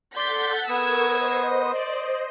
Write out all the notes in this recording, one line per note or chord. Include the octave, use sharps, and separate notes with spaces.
A4 D5 F#5 C6 G6 A6 B6
B3 A#4 C#6 D#6 E6 G#6
C5 D#5
D5